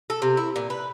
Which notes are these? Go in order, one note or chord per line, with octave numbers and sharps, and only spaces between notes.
A4
C3
E4
A#2
B4